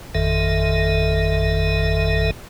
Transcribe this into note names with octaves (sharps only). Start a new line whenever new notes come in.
G#1 F2 D#3 A4 E5